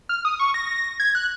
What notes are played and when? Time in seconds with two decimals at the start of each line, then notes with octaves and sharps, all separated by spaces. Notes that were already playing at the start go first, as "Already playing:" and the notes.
0.09 F6
0.25 D#6
0.39 C#6
0.54 A#6
1.00 G#6
1.15 F#6